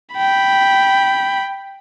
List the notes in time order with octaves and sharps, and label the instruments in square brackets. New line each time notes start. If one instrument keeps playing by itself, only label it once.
[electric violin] G5 B5